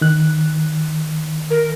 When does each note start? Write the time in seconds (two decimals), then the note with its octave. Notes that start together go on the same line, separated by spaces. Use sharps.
0.01 D#3 F#6
1.50 A#4